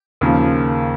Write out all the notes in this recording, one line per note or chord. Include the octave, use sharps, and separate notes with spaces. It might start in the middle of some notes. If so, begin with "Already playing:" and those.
D#2 C#3 F3